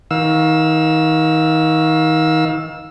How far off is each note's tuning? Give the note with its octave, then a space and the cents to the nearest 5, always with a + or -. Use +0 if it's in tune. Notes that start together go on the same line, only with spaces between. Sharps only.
D#3 +30 F5 +30 E6 +0